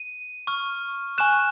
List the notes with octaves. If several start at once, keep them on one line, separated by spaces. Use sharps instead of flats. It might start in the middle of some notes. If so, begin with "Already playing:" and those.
Already playing: D#7
C#6 F6
G#5 C#6 F#6 E7